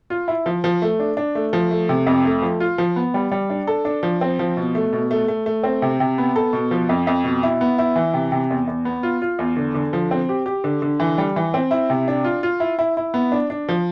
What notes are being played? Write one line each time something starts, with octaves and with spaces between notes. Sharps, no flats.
F4
E4
F3
F3
A3
D4
D4
A3
F3
A3
C3
F2
A3
F3
F4
F3
B3
G3
G3
D4
A4
D4
F3
C4
F3
B2
A3
B2
A3
A3
A3
C4
C3
C3
B3
A4
B2
F3
F2
F2
B2
E4
B3
E4
E3
C3
C3
E2
E2
B3
F4
F4
E2
D3
D3
F3
C4
G4
G4
D3
D3
E3
G3
E3
C4
E4
C3
D4
F4
F4
E4
E4
E4
B3
D4
D4
F3